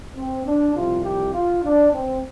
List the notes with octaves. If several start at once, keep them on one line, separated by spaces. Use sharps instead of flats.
C4
D4
C2 C3 F3 F4
G4
F4
D4
C4